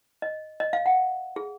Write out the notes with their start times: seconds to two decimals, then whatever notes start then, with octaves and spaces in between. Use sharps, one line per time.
0.22 D#5
0.60 D#5
0.73 F5
0.86 F#5
1.36 G#4